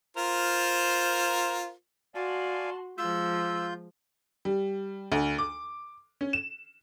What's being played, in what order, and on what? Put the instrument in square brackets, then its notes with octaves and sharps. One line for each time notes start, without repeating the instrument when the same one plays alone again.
[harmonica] F4 A#4 C5
[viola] F#4 C6 [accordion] D5 F5 G#5 [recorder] A5
[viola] F3 G#3 [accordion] F4 G6 [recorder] E6
[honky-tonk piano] G3
D2
D6
C#4
E7